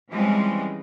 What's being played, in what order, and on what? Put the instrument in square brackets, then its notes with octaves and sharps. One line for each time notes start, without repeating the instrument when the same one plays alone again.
[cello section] E3 F3 G3 G#3 C4 C#4